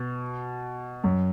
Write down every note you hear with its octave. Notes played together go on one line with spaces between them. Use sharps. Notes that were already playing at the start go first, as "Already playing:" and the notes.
Already playing: B2
F#2